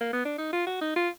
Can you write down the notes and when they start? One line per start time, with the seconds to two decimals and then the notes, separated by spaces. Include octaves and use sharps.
0.01 A#3
0.13 B3
0.26 D4
0.38 D#4
0.53 F4
0.67 F#4
0.81 D#4
0.96 F4